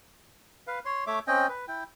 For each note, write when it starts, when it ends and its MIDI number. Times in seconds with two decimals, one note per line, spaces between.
0.67 0.79 71
0.67 0.79 77
0.85 1.04 73
0.85 1.04 84
1.07 1.19 57
1.07 1.19 73
1.07 1.19 76
1.07 1.19 86
1.27 1.47 60
1.27 1.47 61
1.27 1.47 75
1.27 1.47 79
1.49 1.65 71
1.68 1.84 64
1.68 1.84 79